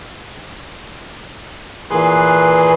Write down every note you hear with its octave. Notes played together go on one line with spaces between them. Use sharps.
A#2 E3 G#4 B4 C6 F#6